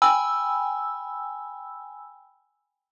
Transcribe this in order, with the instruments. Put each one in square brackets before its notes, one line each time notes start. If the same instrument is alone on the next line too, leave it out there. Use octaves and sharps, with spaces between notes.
[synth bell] G5 G#5 B5 E6